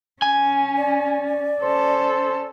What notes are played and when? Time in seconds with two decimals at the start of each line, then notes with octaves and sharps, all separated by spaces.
0.22 C#4 G#5
0.77 D5
1.62 C#4 A4 C5